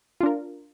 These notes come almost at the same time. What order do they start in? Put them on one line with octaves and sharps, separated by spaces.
F4 D4 A#4